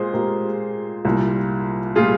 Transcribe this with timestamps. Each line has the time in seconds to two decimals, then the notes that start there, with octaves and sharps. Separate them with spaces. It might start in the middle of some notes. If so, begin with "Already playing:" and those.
Already playing: A#2 G#3 G#4 C5
0.13 A#2 G#3 C4 G4 A#4
1.05 C2 A#2 G3
1.95 A#2 G3 F4 G#4